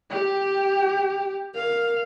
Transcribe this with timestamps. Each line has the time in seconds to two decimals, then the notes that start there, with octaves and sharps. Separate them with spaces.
0.10 G4
1.55 A#4 F5